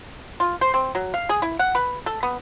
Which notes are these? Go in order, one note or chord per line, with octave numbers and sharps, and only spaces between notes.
F4
C5
C4
F#3
F5
G#4
E4
F#5
B4
A4
B3